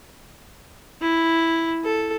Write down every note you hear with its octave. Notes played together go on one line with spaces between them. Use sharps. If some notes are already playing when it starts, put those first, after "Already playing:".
E4
A4